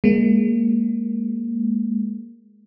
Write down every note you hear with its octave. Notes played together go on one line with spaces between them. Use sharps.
G#3 A#3